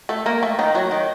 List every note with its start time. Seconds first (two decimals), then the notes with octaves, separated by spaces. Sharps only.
0.09 A3 A4
0.26 A#3 A#4
0.43 A3 A4
0.59 D#3 D#4
0.75 F#3 F#4
0.91 D#3 D#4